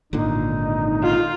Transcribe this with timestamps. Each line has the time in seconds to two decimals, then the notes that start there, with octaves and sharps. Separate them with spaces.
0.13 G#1 A#2 D3 D#4
1.03 F4